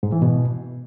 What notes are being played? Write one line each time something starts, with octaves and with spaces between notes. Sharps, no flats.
G#2
E3
B2